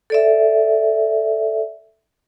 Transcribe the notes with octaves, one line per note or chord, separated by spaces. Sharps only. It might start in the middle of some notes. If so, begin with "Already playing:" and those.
A4 D5 E5